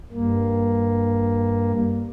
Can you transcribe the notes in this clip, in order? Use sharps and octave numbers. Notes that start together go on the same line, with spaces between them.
G2 A#3